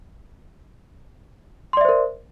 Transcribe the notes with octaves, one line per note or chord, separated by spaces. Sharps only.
A#4 C5 D5 E5 C6